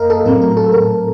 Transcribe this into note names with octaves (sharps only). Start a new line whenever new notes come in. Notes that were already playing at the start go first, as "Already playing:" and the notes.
Already playing: F#2 A#3 A#4 D#5 F5
A4
A2 F#3 A3 C4 A#4
A#4
A4
A#4